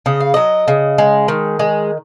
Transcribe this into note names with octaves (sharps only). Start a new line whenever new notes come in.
C#3 D#5
F5
F#3 D#5
C#3
G#3
D#3
G#3